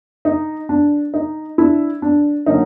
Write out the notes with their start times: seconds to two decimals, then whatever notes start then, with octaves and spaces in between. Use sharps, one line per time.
0.25 D#4
0.69 D4
1.14 D#4
1.58 D4 E4
2.02 D4
2.46 D3 F#3 A#3 C#4 D#4